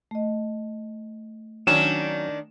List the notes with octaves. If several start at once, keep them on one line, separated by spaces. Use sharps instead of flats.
A3 D#5
D#3 F#3 C#4 D4 E7